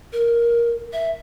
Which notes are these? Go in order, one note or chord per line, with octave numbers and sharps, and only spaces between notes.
A#4
E5